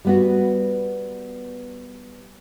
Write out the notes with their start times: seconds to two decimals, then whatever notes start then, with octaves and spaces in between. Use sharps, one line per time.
0.05 G3 B3 F#4